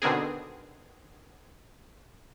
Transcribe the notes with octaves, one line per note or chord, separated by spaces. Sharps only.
B2 D3 D#3 C4 G#4